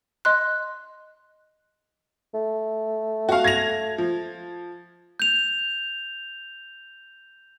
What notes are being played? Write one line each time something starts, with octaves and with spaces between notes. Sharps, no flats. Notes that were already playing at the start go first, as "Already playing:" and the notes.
D#5 C6 F#6
A3
F#4 F5
G#6 A#6 F7
F3
G6 F7